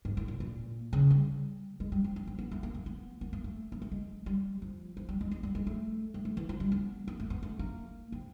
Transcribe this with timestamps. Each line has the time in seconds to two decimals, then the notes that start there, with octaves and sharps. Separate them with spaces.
0.05 G#2
0.17 A2
0.28 A#2
0.40 A#2
0.93 C#3
1.11 G3
1.80 G#3
1.92 G3
2.04 C4
2.16 B3
2.27 C4
2.39 B3
2.51 A3
2.63 A#3
2.75 A#3
2.86 B3
3.21 A#3
3.33 A#3
3.44 A3
3.72 A#3
3.82 A3
3.92 G#3
4.26 G3
4.62 F3
4.97 F3
5.09 G3
5.21 G#3
5.31 G#3
5.43 G3
5.55 G#3
5.67 A3
6.14 G3
6.25 A3
6.37 E3
6.49 F3
6.60 G3
6.72 B3
7.08 A#3
7.20 A3
7.30 B3
7.43 A3
7.59 A#3
8.12 C4